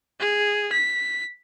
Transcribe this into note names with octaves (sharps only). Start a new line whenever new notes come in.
G#4
B6